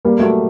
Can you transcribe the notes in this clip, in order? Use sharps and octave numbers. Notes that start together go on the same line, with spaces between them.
G3 A#3
F#3 A3